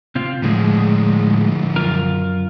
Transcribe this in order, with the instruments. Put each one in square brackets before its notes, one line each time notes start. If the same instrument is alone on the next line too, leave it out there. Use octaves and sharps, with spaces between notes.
[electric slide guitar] C3 C4 F4
[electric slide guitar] A2 G#3 [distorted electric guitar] D3 F3
[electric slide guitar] F#2 F4 A#4